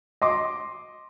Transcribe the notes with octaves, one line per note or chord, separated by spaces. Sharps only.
D#5 C6 D6